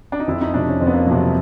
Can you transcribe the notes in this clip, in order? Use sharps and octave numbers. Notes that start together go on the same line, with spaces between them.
D4
D#4
F2 E4
D#4
C3 F3 D4
C#4
F2 C4
B3
A#3
F3 F#3
C3
G3